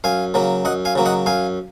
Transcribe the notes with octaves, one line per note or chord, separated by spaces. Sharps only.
F#2 F5 G#5
C#3 F#3 A#3
F#2 D#5 F#5
F5 G#5
C#3 F#3 A#3
D#5 F#5
F#2 F5 G#5